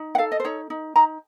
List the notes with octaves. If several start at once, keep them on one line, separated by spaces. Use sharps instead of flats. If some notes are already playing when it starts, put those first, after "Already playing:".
Already playing: D#4
F#5
A4 F5
D#5
C5
D#4 C#5
D#4
D#4 A#5